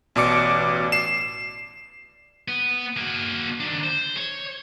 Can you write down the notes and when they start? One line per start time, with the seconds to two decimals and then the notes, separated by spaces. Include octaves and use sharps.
0.15 A1 B2 D5 D6 C#7
0.92 C7 E7
2.48 B3
2.97 A#3 F#4
3.60 D#3 D4
3.83 C5
4.17 C#5